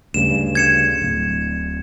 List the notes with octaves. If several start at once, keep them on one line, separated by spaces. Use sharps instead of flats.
D2 G2 C#3 E7
G#6 C#7 E7
D1